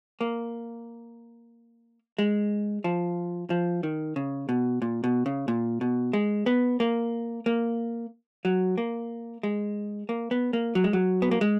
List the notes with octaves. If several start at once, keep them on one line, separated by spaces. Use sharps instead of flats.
A#3
G#3
F3
F3
D#3
C#3
B2
A#2
B2
C#3
A#2
B2
G#3
B3
A#3
A#3
F#3
A#3
G#3
A#3
B3
A#3
F#3
G#3
F#3
B3
A#3
G#3